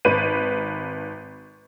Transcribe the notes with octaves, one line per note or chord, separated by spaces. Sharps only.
G#1 B4 D#7